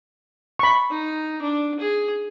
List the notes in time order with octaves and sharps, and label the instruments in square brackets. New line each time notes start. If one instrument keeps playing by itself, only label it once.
[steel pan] B5 C#6
[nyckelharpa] D#4
D4
G#4